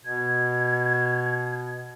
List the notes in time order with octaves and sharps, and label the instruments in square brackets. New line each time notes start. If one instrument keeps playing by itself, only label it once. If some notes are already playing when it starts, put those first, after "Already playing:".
[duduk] B2 [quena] G#6